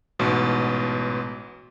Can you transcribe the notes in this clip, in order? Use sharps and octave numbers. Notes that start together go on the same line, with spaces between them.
A1 G#2 B2